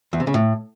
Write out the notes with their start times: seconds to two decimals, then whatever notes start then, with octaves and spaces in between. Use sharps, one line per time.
0.13 E2
0.20 C3
0.27 C#3
0.34 A2